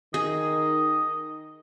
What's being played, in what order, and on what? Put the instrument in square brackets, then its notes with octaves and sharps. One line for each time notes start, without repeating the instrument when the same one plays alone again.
[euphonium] D#3 [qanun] G#4 [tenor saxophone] D#5